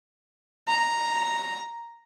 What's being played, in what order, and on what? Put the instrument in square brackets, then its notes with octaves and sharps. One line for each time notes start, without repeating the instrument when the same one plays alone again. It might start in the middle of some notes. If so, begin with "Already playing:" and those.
[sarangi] A#5